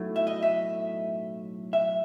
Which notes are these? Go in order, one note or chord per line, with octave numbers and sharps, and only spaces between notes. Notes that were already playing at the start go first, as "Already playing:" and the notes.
Already playing: B1 A2 F#3 A3
E5
D#5
E5
E5